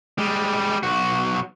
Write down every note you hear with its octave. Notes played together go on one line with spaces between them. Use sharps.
G3 G#3
B1 F#4